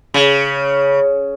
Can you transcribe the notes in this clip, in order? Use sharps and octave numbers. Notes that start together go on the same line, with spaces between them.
C#3